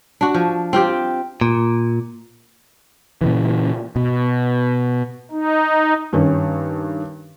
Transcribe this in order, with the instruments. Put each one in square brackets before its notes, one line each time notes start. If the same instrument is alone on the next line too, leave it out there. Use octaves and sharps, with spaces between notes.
[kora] D4 F#4
F3
C4 F4 G4 G5
[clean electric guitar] A#2
[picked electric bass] A#2 C#3 E3
B2
[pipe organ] D#4
[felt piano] G2 D#3 C#4